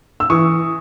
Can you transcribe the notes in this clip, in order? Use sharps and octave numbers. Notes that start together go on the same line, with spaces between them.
E6
E3 C#6 D#6